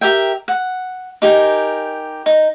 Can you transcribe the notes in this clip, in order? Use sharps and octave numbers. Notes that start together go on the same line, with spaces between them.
G4 A#4 E5 G5
F#5
D#4 G4 A#4 G#5
D#4